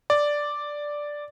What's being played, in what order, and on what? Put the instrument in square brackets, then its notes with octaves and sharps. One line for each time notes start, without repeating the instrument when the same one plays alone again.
[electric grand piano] D5